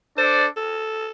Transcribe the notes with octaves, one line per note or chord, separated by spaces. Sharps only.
D4 A4 C5 D5
A4